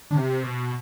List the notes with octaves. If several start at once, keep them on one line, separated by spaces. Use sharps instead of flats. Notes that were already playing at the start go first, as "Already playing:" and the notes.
D3
C3
B2